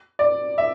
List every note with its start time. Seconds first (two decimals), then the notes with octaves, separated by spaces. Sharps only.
0.19 D5
0.58 E5